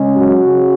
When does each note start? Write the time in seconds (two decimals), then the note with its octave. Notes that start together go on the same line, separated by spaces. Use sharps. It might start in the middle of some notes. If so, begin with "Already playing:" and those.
Already playing: C#3 G#3 C#4
0.15 F#3 F#4
0.44 C#3